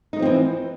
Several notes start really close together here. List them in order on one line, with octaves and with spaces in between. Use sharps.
D#4 G#3 F3 C4 E3